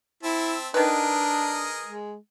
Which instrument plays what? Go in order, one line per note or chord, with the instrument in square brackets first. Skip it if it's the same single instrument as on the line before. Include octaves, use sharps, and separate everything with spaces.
[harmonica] C4 E5 A5 [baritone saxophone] E4
[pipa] D#3 B4 [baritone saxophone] D4 [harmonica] G#4 A#4 D#5
[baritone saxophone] G#3